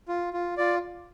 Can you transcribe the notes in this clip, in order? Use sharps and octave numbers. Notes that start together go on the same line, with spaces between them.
F4
F4
F4 D5